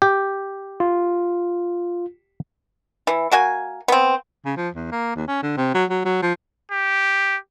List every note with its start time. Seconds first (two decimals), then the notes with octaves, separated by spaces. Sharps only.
0.02 G4
0.80 F4
3.07 E3
3.32 A#3 F#4 G#5
3.88 B3 C4
4.45 C#3
4.57 F3
4.74 E2
4.92 A#3
5.16 D#2
5.27 C#4
5.42 D3
5.57 C3
5.75 F#3
5.90 F#3
6.05 F#3
6.22 F3
6.71 G4